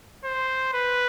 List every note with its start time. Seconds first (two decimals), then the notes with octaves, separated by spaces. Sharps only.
0.24 C5
0.73 B4